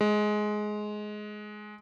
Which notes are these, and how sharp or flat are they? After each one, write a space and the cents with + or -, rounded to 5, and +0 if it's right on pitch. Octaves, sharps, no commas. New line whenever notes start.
G#3 +15